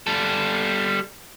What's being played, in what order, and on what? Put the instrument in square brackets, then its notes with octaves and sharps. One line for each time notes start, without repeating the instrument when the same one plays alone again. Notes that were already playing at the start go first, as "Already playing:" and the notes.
[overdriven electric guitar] G3 A4